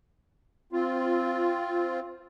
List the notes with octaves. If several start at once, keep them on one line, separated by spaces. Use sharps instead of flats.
C4 F4